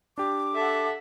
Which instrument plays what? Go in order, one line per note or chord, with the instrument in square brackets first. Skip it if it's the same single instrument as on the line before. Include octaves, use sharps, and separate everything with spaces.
[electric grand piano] D4 G4 [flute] D6
[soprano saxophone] A4 [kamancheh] E5 F#5